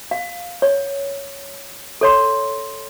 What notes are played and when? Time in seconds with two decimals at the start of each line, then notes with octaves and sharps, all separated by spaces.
0.11 F5
0.62 C#5
2.01 A4 C#5 C6